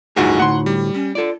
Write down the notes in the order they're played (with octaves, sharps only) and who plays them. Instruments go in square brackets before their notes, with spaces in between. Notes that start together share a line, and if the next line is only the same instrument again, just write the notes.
[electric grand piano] A1 D2 F#4 [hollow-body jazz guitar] G2 F4 G#4 [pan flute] D#4
[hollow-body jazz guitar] D2 A2 [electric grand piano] F#5 C6
[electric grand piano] G3
[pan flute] C#4
[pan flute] F4 [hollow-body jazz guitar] A4 D5